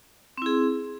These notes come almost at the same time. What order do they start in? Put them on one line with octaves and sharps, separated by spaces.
C4 E4 G#4